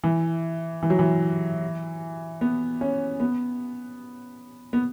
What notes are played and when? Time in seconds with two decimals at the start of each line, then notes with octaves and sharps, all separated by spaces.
0.04 E3
0.83 E3
0.90 F#3
0.99 E3
2.41 B3
2.81 C#4
3.20 B3
4.73 B3